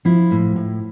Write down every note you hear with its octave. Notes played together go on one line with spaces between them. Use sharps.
F3 E4
A2
A2